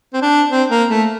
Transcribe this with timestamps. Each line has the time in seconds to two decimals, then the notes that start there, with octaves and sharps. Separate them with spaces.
0.13 C4
0.22 D4
0.50 C4
0.70 A#3
0.90 A3